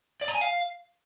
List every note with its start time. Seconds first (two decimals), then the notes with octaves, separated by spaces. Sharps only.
0.21 D5
0.28 A#5
0.35 G#5
0.41 F5